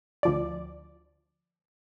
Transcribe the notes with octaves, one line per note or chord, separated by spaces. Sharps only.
D2 F3 D5